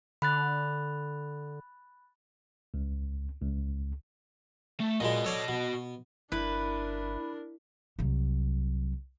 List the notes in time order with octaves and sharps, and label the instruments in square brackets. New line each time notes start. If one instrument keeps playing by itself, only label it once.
[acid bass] D3 [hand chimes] B5 F#6 A6
[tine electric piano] C#2
C#2
[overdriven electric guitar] A3
[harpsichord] A#2 G#3 [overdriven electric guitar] F#4 D#5
[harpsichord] A4 C#5 D5
B2
[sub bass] G1 [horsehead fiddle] D4 A#4 [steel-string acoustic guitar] E4 [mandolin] B4
[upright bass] C2 F#3